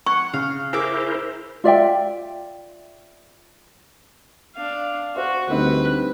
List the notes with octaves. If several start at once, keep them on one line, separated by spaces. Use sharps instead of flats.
F#5 C#6
C#3 F5
E4 G#4 A#4 C5 E5 D6
F4 D5 E5 G5
D4 F5
F#4 C5
D2 G3 C4 D#4 B4